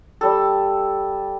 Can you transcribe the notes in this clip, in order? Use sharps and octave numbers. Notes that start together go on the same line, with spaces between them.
G3 A4